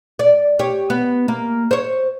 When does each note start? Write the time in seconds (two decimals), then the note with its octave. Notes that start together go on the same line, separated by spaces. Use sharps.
0.19 D5
0.59 G4 C#5
0.90 B3
1.28 A#3
1.71 C5 C#5